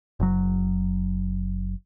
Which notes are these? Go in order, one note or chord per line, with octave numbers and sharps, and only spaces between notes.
F#1 F#3